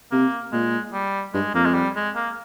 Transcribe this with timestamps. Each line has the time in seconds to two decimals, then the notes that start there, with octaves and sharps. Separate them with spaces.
0.11 C3 A#3
0.52 A#2 G#3
0.93 G3
1.33 G2 G#3
1.54 F2 A#3
1.65 G#3
1.74 G3
1.95 G#3
2.15 A#3